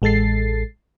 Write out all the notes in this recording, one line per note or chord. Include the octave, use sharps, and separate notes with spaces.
A1 G#3 A4 A6 C7